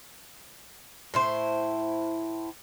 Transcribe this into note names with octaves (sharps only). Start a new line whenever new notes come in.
A2 E4 C5